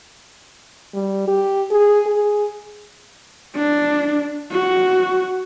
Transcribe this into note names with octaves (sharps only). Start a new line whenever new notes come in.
G3
G4
G#4
G#4
D4
F#4